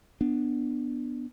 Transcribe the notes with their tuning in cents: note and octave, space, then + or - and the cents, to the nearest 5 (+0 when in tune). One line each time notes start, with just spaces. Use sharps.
B3 +0 D4 +10